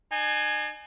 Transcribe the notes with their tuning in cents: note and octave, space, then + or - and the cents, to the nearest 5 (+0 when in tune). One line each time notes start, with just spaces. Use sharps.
D#4 -45 G#5 +10